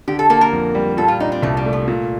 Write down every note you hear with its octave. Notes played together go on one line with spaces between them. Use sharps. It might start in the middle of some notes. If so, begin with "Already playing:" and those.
D3 G4
A4
A#3 A4
A#4
F2
G3
A#2 A4
F4
D4 D#4
C4
C2 A3
G3
A3
F3
A#2